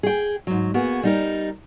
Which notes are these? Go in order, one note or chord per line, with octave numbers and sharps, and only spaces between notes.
G#4 G5
G#2 F#3
A#3 B3 F#4 G#4
G3 D#4 A#4